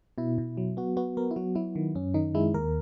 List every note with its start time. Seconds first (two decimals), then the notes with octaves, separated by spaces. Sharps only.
0.18 B2 E4
0.38 B2
0.57 F#3
0.77 B3 F#4
0.97 B3 F#4
1.17 B3 A#4
1.31 E4
1.36 F#3 F#4
1.55 F#3 E4
1.76 D#3
1.95 F#2 C#4
2.14 D#3 D#4
2.35 G#3 E4
2.54 D#2 A#4